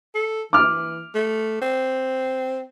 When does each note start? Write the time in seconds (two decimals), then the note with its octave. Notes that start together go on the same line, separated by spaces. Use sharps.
0.15 A4
0.53 E3 D6 F6
1.15 A3
1.62 C4